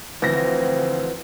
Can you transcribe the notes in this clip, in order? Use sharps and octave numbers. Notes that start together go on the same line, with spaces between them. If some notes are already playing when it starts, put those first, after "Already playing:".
D2 E3 F3 C4 A#6